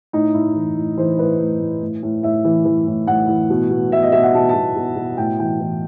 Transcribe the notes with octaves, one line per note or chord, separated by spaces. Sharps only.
A2 D#4
A2 E4
E3
A2
E3 C5
A2 B4
A2
A2
A2
A2
A2 E5
E3
E3
A2
A2 F#5
E3
B2
B2
B2 E5
D#5
B2 E5
F#5
B2 A5
A5
B2
B2
B2
A2 G5
E3 G5
E3